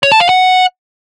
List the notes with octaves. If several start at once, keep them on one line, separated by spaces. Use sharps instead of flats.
C#5
A5
F5
F#5